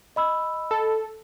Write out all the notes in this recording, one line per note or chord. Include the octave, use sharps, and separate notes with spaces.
D#5 B5 E6
A4